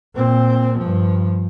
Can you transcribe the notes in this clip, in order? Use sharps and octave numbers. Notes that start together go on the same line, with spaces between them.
A#2 C4
G2 F3